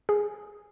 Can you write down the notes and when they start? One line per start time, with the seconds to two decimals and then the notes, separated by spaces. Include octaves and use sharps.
0.09 G#4